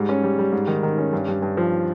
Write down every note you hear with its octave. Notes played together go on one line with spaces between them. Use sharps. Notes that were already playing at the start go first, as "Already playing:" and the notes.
Already playing: G#2 G3
C#4
G3
G3
G#2
D#3
D#3
C#4
G2
G2
G2
F3